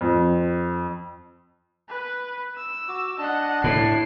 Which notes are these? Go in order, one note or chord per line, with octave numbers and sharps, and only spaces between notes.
F2
B4
E6
F#4 D6
D4 D#5 F#5 A5
A2 C7